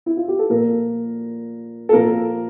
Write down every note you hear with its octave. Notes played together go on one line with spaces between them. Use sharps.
E4
F4
G4
A4
A#2 F3 A#3 A#4
A4
A#2 F3 A#3 A#4